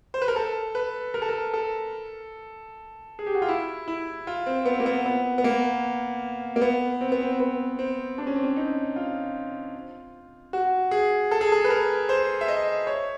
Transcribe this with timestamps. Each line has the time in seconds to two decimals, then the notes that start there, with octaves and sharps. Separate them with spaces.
0.14 C5
0.22 B4
0.28 A#4
0.36 A4
0.75 B4
1.14 A#4
1.22 A4
1.29 A#4
1.54 A4
3.19 G#4
3.26 G4
3.35 F#4
3.42 F4
3.48 E4
3.88 E4
4.27 F4
4.46 C4
4.66 B3
4.80 A#3
4.86 B3
5.06 B3
5.38 B3
5.44 A#3
6.56 A#3
6.61 B3
7.01 C4
7.12 B3
7.22 C4
7.32 C4
7.40 B3
7.79 C4
8.18 D4
8.27 C#4
8.36 C4
8.43 C#4
8.57 D#4
8.96 F4
10.53 F#4
10.91 G#4
11.31 A4
11.41 G#4
11.52 A4
11.64 B4
11.70 A#4
12.09 C5
12.41 E5
12.48 D#5
12.87 C#5